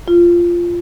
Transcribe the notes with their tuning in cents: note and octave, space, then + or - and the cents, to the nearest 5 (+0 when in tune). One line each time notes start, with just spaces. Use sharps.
F4 -10